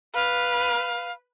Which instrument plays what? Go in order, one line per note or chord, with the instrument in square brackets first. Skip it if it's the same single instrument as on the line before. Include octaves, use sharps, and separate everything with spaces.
[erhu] B4 [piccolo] F5